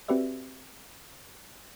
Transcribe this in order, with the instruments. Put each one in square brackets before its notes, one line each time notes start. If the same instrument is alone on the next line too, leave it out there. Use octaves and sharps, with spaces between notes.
[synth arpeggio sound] C4 F#4 G4 B4 D5 E5